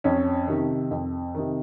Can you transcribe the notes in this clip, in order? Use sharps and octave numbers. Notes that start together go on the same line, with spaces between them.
F2 C#4
C3 D#3
F2
C3 D#3